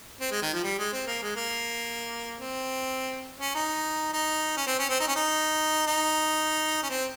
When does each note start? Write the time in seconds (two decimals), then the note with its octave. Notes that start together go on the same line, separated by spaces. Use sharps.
0.21 C4
0.31 G#3
0.42 D#3
0.53 F3
0.63 G3
0.79 G#3
0.93 C4
1.07 A#3
1.22 G#3
1.36 A#3
2.38 C4
3.40 C#4
3.55 D#4
4.13 D#4
4.57 C#4
4.67 C4
4.79 C#4
4.90 C4
5.00 D#4
5.08 C#4
5.16 D#4
5.87 D#4
6.83 C#4
6.90 C4